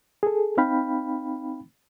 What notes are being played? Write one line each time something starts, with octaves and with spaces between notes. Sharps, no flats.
G#4 A4
C4 D#4 F5 G5 B5